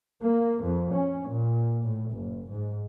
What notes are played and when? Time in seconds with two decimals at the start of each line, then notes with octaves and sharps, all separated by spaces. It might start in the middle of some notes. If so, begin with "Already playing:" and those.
0.23 A#3
0.63 F2
0.93 C#4
1.30 A#2
1.84 A2
2.13 F#1
2.51 G#2